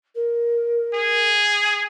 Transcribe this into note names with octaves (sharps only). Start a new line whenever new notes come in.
A#4
G#4